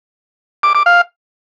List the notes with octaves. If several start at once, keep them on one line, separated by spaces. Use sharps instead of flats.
D6
D6
F5